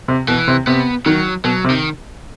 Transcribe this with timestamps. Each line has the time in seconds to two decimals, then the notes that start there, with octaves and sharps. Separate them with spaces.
0.08 C3
0.28 B2 E3
0.48 C3
0.67 C3 B3
1.06 D#3 F#3
1.44 B2 F#3
1.64 C3
1.70 D#3